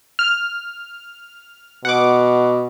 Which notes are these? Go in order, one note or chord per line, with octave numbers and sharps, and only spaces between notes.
F6
B2 F#5 D6